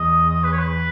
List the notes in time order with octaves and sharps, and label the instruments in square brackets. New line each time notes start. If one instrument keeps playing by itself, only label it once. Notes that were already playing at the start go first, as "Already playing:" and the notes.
Already playing: [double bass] E2 [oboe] D#5
[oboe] D#5
B4
C#5
B4